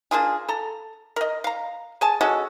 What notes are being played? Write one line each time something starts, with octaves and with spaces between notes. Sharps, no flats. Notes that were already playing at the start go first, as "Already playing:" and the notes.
A#3 D4 F4 G#4
A4 A#5
A#4 D#5
F5 A#5
G#4 G#5 A5
G#3 C#4 F#4 A4